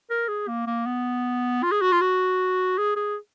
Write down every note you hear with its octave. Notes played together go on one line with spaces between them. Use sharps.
A#4
G#4
A#3
A#3
B3
F4
G#4
F#4
F4
F#4
G#4
G#4